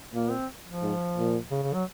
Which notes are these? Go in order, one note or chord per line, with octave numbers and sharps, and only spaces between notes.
A#2 A#3
C4
F3
G#2
A#2
C#3
C#3
F#3